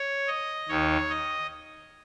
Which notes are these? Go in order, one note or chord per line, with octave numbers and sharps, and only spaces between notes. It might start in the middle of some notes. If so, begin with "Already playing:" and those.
Already playing: C#5
D#5
D#2 D#3 C#5
D#5